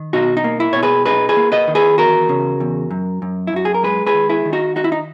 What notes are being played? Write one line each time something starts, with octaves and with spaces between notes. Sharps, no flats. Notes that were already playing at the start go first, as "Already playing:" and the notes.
Already playing: D#3
B2 D#4 F#4
D#4
A#3
E4
B2 C#5
G#4 B4
D#4 G#4 B4
G#4 B4
A#3
B4 D#5
D#3
G#4 B4
E2 F#4 A#4
C#3
E2
F#2
F#2
E4
F#2 F#4
G#4
A#4
G#3 G#4 B4
G#4 B4
D#3
E4 G#4
D#3
D#4 F#4
D#4 F#4
E4
D#4